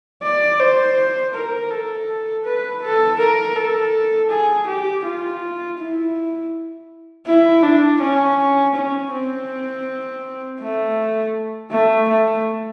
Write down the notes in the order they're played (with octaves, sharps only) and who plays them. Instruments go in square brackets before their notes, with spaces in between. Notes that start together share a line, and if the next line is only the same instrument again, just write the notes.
[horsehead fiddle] D5
C5
A#4
A4
B4
A4
A#4
A4
G#4
G4
F4
E4
E4
D4
C#4
C#4
C4
A3
A3
A3